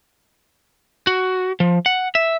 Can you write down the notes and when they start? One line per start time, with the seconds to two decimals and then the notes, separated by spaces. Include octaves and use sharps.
1.07 F#4
1.60 F3
1.86 F#5
2.15 E5